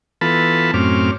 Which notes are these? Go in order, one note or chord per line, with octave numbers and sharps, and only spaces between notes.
E3 B3 F4 A4 A5 B5
F#2 A2 C4 C#4 D6 F6